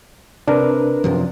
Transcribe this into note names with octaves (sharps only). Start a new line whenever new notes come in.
C3 D4 A#4 B4
F#2 C3 F3